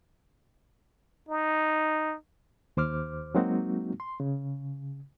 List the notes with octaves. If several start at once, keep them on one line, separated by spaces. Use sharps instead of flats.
D#4
D#2 C5 D6 F6
F#3 G#3 A#3 C4 D#4 F#4
C6
C#3